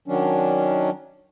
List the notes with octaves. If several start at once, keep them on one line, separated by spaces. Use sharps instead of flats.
D#3 F#3 C#4 D4